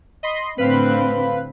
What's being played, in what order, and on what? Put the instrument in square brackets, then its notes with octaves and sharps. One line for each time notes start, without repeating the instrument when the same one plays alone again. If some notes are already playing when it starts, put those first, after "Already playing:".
[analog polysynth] D#5 B5 C6
[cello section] A2 D3 C4 [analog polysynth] B4 F5 B5